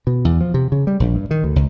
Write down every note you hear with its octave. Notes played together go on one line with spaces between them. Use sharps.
B2
E2
F3
C3
C#3
G3
A#1
G2
D#3
D2
C#2